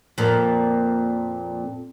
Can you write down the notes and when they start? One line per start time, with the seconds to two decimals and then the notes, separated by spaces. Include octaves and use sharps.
0.18 F2 A#2